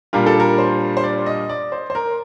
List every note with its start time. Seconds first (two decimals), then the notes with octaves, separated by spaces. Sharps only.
0.13 A#2 G3 D4 F4 A#4
0.27 A4
0.40 A#4
0.58 C5
0.97 C5
1.04 D5
1.26 D#5
1.49 D5
1.72 C5
1.90 C5
1.95 A#4